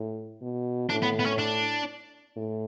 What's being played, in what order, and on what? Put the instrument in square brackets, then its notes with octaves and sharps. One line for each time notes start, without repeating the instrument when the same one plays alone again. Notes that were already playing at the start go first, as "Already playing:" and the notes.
Already playing: [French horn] A2
B2
[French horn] A2 [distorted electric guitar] D4
[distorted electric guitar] B3
B3
C#4
D4
[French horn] A2